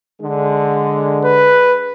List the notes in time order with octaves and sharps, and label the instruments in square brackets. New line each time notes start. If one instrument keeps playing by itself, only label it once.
[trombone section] D3 G#3
[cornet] B4